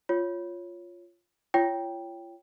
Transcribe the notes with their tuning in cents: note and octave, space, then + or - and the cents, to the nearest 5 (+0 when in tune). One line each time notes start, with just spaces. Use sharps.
F4 +0 C#5 +0
F4 -35 C#5 +10 G5 +0